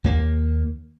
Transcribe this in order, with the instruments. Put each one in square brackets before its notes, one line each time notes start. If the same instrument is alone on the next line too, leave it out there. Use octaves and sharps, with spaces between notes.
[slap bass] D#2 A#3